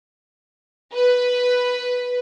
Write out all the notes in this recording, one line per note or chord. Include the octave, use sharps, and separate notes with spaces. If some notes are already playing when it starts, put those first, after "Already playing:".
B4